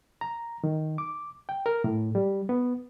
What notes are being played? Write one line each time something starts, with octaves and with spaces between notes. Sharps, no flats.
A#5
D#3
D6
G5
A#4
A2
G3
B3